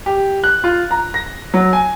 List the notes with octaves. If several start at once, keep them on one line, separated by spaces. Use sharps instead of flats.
G4
F#6
F4
A#5
A#6
F#3
G#5